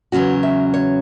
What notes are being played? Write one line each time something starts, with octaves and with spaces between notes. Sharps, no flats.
E2 C#3 F#3 C#4 F#4
E5
C#5